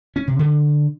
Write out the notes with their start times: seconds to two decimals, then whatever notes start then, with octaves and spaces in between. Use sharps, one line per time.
0.16 C#4
0.27 C3
0.39 D3